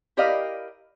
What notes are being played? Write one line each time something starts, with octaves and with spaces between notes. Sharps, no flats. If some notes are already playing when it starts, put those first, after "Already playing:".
E4 G4 A#4 D5 D#5 F5